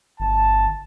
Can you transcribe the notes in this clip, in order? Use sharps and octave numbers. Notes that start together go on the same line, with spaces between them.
G1 A5